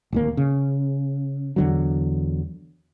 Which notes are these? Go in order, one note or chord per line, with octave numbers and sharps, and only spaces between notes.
D1 D#2 A#3
C#3
E2 D3 F#3